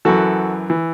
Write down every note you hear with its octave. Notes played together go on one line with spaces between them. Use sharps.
F#2 E3 F#4 A4
E3